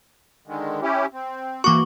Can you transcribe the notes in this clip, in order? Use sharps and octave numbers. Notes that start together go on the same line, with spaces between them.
D3 D#3 G#3
C#4 E4 G4
C4
E3 A#3 F#4 C#6 D6